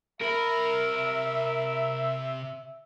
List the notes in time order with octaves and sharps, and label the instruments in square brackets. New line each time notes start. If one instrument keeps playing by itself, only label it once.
[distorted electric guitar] C3 B5 [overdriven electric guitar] A#4 [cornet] E5